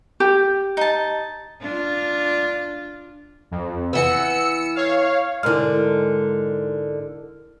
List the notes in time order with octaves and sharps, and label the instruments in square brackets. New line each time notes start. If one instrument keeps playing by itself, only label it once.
[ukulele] G4
[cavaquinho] D#4 A5
[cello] D4 F4
[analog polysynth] F2
[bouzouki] E3 B3 [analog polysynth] E6 C#7
[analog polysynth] C#5 F5
[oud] G#2 D3 [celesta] E4 A#4 F6